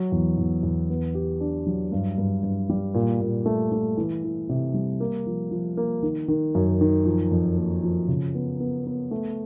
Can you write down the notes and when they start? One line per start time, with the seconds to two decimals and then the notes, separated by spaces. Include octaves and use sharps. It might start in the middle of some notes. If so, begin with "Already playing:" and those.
Already playing: F#3
0.12 E2
0.38 E2
0.63 E2
0.89 B3
1.15 G4
1.40 D4
1.67 F#3
1.92 G2
2.18 G2
2.43 G2
2.70 G3
2.94 A#2
3.21 A#2
3.46 A3
3.72 A3
3.97 E3
4.24 E3
4.49 C3
4.74 G3
5.00 A#3
5.27 F3
5.51 F3
5.77 A#3
6.03 D#3
6.28 D#3
6.55 F#2
6.81 D#3
7.06 F3
7.31 F2
7.57 A#3
7.83 F3
8.08 C#3
8.34 B3
8.60 B3
8.86 B3
9.11 A3